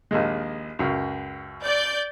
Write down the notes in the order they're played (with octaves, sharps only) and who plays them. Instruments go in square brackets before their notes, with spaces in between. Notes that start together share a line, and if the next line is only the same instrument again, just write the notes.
[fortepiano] A#1 D#2 G#3
C#2 F#2
[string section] D5 G6